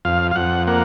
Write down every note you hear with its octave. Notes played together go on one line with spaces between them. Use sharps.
F2 F5
F5
F2 F#5
A#3 F#5